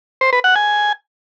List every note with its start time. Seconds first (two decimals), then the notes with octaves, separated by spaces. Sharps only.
0.21 C5
0.33 B4
0.44 F#5
0.56 G#5